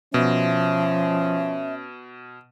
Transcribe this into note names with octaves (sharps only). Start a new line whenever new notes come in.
B2 F3 C#4 E5